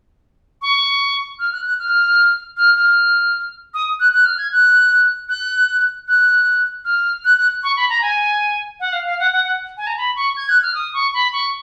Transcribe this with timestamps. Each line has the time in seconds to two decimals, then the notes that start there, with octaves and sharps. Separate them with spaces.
0.62 C#6
1.39 F6
1.53 F#6
1.65 F#6
1.79 F6
2.57 F6
2.76 F6
3.74 D#6
4.00 F#6
4.13 F#6
4.25 F6
4.38 G#6
4.52 F#6
5.29 F#6
6.08 F#6
6.85 F6
7.25 F#6
7.38 F#6
7.63 C#6
7.77 B5
7.89 A#5
8.02 G#5
8.80 F#5
8.93 F5
9.06 F5
9.19 F#5
9.33 F#5
9.45 F#5
9.77 G#5
9.87 A#5
9.98 B5
10.16 C#6
10.37 G#6
10.49 F#6
10.63 F6
10.74 D#6
10.94 C#6
11.14 B5
11.33 C#6